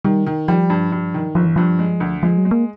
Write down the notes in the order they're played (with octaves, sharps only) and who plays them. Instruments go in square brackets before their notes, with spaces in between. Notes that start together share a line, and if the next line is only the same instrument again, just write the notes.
[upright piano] D#3 [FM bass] G3
[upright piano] D#3
[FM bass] F3 [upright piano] G3
[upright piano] G2
G2
D#3
[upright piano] G1 [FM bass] F3
[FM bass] E3
[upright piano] G2 [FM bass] F3
[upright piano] G#3
D2
[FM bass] F3 [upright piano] G#3
[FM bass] F#3
[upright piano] G#3
[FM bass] A#3